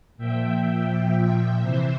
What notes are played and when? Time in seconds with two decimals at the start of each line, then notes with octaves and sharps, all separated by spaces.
0.17 A#2 F3 E5 G5
1.60 C3 E3 C5 E5